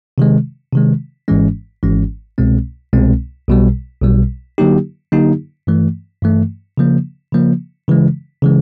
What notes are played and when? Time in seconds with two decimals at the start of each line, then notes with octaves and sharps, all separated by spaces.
0.18 C3 D#3 G#3
0.72 C3 D#3 G#3
1.28 G#1 G#2 E3 G#3 C#4
1.83 G#1 G#2 E3 G#3 C#4
2.38 C2 B2 G#3 C4
2.93 C2 B2 G#3 C4
3.48 B1 B2 G3
4.02 B1 B2 G3
4.58 D3 F#3 A#3 D#4 G4
5.12 D3 F#3 A#3 D#4 G4
5.67 G2 E3 A3
6.22 G2 E3 A3
6.78 C#3 F3 A#3
7.33 C#3 F3 A#3
7.88 C#3 E3 G#3
8.43 C#3 E3 G#3